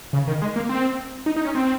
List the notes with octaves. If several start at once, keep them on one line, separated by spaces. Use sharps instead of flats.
C#3
D#3
G#3
A#3
C4
D#4
D#4
C#4
C4